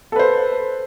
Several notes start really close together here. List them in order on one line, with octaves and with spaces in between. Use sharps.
A4 B4 C5